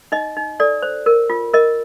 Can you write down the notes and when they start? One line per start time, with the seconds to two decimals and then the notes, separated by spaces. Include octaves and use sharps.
0.12 D#4 D#5
0.36 D#4
0.60 A4 D5
0.83 C5
1.06 A#4
1.30 F4
1.54 A#4 D#5